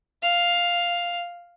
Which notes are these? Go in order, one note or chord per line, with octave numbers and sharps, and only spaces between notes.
F5